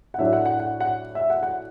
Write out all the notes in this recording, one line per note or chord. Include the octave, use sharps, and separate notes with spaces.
F#5
A2 F#3 D4 E5
F#5
F#5
F#5
F#5
E5
F#5
F#5